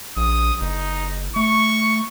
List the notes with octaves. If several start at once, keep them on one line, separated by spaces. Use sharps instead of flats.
A#1 D#6
F#1 D#4
A3 C#6